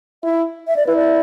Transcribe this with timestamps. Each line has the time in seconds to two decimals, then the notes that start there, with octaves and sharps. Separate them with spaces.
0.24 E4 E5
0.68 E5
0.77 D5
0.87 E4 B4
0.96 D5